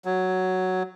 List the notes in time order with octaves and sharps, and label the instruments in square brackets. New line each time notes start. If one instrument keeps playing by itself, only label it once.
[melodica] F#3